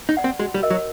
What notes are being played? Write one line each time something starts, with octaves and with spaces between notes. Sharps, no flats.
D#4
D5 F#5
C4
G#3 F#4
G3
A#4 D#5
F#3